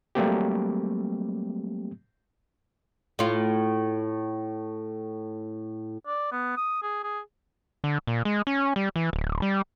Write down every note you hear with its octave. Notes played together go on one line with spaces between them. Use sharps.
F#3 G3 A3 A#3 C4 G4
A2 F4
D5
B3
D#6
G#4
G#4
D3
A#2
G#3
C#4
G3
E3
D1
G3